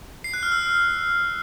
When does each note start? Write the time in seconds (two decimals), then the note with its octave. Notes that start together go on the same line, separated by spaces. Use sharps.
0.24 C7
0.34 F#6
0.43 F6
0.52 E6